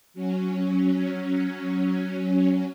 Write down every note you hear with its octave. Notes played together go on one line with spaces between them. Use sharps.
F#3 C#4